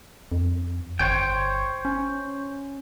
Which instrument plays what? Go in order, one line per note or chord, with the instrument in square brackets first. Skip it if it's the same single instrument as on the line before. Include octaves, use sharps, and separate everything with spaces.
[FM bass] F2
[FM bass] G1 [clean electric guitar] C5 C#5 G5
[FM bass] C#4